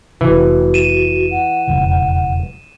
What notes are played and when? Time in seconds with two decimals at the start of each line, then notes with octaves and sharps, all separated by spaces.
0.21 F1 C3 E3 F#4
0.74 D#7 E7
1.31 F#5
1.67 E1 F2 C#3